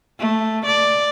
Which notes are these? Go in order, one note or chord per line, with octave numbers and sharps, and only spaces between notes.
A3
D5